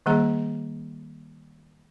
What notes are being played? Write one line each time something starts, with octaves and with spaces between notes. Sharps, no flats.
D#3 G3 A#3 G#4 A#5